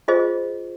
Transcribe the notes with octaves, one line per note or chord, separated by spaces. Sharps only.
F4 G#4 C5 D#5